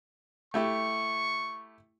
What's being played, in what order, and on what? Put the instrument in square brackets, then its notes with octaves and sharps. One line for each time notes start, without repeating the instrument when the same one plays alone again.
[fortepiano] A3 E4 G4 [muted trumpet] C#6